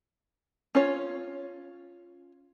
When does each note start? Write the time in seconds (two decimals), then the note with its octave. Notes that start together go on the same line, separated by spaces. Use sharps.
0.75 C#4 F4 C#5